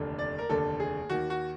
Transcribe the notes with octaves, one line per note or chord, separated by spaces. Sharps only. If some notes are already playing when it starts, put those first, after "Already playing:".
Already playing: F1 D#2 D3
D5
A#4
F1 D#2 D3 A4
G#4
D#2 D#3 F#4
F#4